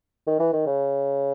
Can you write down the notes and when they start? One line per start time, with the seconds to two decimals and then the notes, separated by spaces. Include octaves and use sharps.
0.27 D#3
0.39 E3
0.53 D#3
0.66 C#3